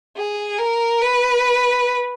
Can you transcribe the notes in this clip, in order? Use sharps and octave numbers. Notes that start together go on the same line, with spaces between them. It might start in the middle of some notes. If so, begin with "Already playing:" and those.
G#4
A#4
B4